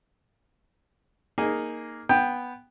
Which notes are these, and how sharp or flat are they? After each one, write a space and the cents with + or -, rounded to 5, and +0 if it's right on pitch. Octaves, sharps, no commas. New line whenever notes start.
A#3 +0 D#4 +0 G#4 +0
B3 +0 G5 +10